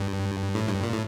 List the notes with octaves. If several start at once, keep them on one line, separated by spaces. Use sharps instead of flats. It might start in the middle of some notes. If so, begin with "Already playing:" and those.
Already playing: G2
A2
G2
A#2
A2